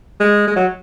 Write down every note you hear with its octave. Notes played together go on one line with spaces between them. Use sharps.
G#3
G#3
F#3